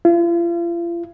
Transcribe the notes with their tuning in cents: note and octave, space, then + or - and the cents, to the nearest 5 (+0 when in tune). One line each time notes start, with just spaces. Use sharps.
F4 -40